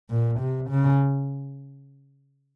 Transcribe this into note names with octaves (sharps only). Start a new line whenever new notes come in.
A#2
C3
C#3